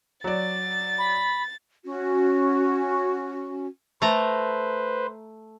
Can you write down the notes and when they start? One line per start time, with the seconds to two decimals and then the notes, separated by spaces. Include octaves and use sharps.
0.24 F#3 D5 A6
0.98 B5
1.85 C#4 F#4
4.02 A3 B4 C5 A#5